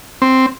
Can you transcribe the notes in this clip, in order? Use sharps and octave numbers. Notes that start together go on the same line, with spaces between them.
C4